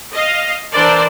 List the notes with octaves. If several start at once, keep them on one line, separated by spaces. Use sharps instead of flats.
D#5 F5
E3 D4 A#4 C5 D5 A5